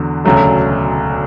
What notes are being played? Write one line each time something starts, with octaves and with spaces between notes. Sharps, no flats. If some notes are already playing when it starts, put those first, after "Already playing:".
Already playing: E2 D3 F#3
E1 D2 C#3 F#3 A3